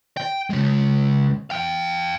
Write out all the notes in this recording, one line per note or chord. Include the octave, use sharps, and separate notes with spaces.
G5
C#3 G#3
F5 G5